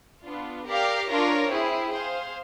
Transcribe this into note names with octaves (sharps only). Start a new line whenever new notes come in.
B3 D4 F4
G4 A#4 D5 F5
D4 F4 A#4 C#5
C4 E4 G#4
G#4 C5 F5